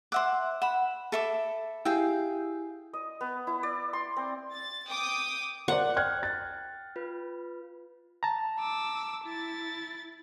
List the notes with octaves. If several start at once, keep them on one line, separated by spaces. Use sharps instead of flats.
C5 E5 F#5 D6 E6 F#6
F#5 B5 E7
A4 E5 D6
E4 G4 G#4 F5 G5
D#5
B3
E4
D5
C6
C4
A6
G5 D6 D#6
A#4 C5 D5 F#5
G5 F6 F#6 G#6
A6
F4 B4
A5 A#5
D6 E6
E4 A6